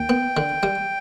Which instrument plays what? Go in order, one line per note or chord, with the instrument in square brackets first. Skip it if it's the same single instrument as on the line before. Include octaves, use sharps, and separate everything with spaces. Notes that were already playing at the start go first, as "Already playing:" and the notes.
Already playing: [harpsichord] D#2 [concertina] G5
[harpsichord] B3
D3
G3